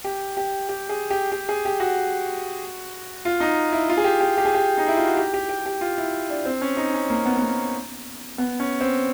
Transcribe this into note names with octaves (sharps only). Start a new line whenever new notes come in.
G4
G4
G4
G#4
G4
G4
G#4
G4
F#4
F4
D#4
E4
F4
G#4
G4
G4
G4
G#4
G4
D#4
E4
F4
F#4
G4
G4
G4
G4
F4
E4
D4
C4
C#4
D#4
C#4
A#3
B3
B3
A#3
B3
C#4
C4